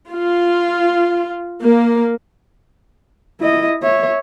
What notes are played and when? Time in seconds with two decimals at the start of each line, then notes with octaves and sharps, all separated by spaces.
0.11 F4
1.62 A#3
3.40 E4 D#5
3.83 C#5 E5